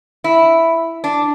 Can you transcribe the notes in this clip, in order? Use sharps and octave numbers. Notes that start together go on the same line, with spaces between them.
E4
D4